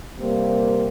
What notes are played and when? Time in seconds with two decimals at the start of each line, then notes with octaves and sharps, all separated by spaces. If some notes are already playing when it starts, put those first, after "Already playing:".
0.18 C3 G3 A#3